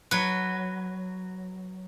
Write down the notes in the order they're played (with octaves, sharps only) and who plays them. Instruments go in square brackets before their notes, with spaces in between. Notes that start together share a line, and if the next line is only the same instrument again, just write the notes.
[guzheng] F#3 B4